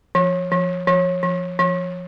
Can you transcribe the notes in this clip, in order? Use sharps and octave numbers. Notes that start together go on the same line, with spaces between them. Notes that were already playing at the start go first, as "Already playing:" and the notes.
F3
F3
F3
F3
F3